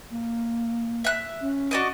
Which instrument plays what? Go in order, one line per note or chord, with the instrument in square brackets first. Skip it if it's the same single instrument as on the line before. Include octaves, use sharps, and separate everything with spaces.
[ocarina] A#3
[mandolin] E5 F#6
[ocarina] C#4
[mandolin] F#4 D5 D#5